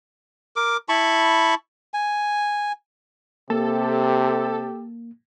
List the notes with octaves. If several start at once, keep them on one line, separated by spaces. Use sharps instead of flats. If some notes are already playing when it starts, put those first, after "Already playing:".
A#4 D6
E4 A5 B5 C#6
G#5
C3 A#3 G4 A4